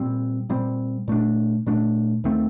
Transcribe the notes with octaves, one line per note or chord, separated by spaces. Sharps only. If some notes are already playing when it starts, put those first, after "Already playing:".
Already playing: A#2 G3 C4
A#2 G3 C4
A#2 A3 D4
A#2 A3 D4
D#2 D#3 A3 C4